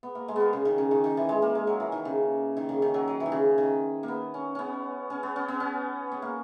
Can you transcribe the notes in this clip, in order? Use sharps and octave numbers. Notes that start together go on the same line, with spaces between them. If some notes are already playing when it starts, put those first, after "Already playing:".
B3
A#3
G#3
A#3 B3
C#3
D#3
C#3
D#3
D#3
E3
G#3
A#3
G#3
F#3
E3
D#3
C#3
D#3
C#3
D#3
F#3
F#3
E3
D#3
C#3
D#3
A#3
B3
C#4
B3 C#4
C#4
B3
C#4
B3
C#4
B3
A#3